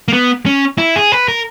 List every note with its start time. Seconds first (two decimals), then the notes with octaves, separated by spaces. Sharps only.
0.08 A#3
0.13 B3
0.46 C#4
0.78 E4
0.96 G#4
1.12 B4
1.28 A#4